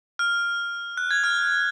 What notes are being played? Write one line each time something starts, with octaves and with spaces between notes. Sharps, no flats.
F6
F#6
G#6
F6